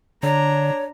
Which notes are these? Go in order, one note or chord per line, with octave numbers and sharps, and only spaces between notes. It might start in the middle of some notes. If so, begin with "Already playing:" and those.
D3 D4 C#5 A#5